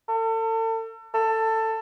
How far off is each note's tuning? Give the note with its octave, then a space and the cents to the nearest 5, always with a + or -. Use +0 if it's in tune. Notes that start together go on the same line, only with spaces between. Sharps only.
A4 +35
A4 +15